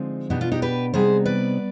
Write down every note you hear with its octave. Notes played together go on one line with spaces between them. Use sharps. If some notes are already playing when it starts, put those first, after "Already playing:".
Already playing: D3 F3 G#3 C4 D#4
B2 B3 D4 D#4 G4
F4
D#4 G4
G4 B4
C3 G3 B3 D#4 G#4 C5
B4 D5